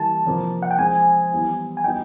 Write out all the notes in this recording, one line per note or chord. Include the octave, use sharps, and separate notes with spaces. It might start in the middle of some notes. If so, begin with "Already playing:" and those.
Already playing: E3 G3 A#3 A5
C3 F3 A#3
F#5
G5
F3 G#3 C4 G#5
E3 G3 B3 E4
G#5
G3 B3 D#4 F#4 G5